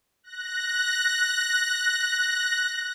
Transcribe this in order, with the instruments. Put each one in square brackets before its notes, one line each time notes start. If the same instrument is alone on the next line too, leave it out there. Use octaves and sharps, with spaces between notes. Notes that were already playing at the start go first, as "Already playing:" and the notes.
[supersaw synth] F#6 A#6